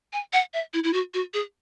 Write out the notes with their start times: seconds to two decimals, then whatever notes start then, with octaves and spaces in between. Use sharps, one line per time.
0.13 G#5
0.33 F#5
0.54 E5
0.73 E4
0.84 E4
0.93 F#4
1.14 F#4
1.34 G#4